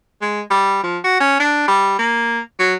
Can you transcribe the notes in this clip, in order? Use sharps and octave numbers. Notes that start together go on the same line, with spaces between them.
G#3
G3
F3
F#4
C#4
D4
G3
A#3
F#3